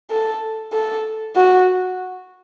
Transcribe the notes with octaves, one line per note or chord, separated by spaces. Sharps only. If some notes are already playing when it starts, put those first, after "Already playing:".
A4
A4
F#4